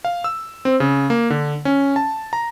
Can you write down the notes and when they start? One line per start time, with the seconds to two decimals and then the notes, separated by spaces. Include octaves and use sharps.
0.05 F5
0.24 E6
0.65 C4
0.80 C#3
1.10 A#3
1.30 D3
1.65 C#4
1.96 A5
2.33 A#5